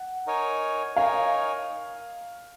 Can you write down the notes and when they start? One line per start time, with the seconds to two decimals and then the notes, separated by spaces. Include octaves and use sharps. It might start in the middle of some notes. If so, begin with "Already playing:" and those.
Already playing: F#5
0.27 D#4 A#4 C#5 G#5
0.96 D#4 A#4 C#5 F5 G#5